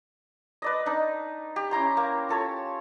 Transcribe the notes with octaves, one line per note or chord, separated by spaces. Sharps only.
B4 D5 D#5
D4 D#4
G4
C#4 E4 A#5 C6
A#3
F4 A4 C#5